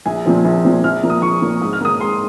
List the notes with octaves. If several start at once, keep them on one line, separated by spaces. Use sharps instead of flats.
A#1 G#5
A#2 F3 C4
A#1
A#2 F3 C4
A#1 F6
A#2 F3 A#3
D#6
A#1 C#6
A#2 F3 A#3
G#2 D#6
F6
D#3 A#3 D#6
G#2 C6